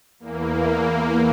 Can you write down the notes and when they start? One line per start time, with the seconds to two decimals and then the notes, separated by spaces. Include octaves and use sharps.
0.19 E2 E3 A#3
0.66 A#3